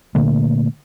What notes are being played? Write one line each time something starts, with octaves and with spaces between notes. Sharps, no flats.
A#2 D3 A3 A#3